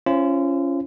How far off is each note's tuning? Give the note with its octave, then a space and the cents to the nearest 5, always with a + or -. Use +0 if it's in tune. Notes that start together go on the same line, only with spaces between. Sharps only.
C#4 +0 F4 -35 C5 +15